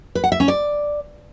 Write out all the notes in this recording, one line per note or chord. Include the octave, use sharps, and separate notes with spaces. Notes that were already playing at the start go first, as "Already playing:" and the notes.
B4
F#5
E5
C#4
D5